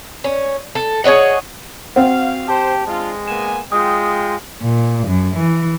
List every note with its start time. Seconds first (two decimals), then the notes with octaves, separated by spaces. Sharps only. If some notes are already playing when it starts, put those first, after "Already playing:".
0.24 C#4
0.75 A4
1.04 G#4 C#5 D#5 F#5
1.96 C4 F#4 F5 F#5
2.48 G4 C5 A5
2.87 G#3 D4 F4
3.28 A#3 B3 G#5 E7
3.72 G#3 F4 G5 D#6
4.62 A#2
5.08 F#2
5.37 E3